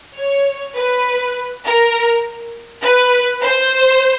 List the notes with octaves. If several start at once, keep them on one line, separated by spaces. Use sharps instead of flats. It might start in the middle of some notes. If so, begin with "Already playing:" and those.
C#5
B4
A#4
B4
C5